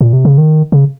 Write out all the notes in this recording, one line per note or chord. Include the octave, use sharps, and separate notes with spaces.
A#2
C3
C#3
D#3
C#3